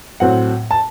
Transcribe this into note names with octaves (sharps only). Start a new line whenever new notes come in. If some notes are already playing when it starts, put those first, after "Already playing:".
A2 F#3 C4 F#5
A5